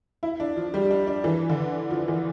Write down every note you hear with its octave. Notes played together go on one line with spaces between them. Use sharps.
E4
D4
F3
G3
D4
D4
E3
D3
F3
E3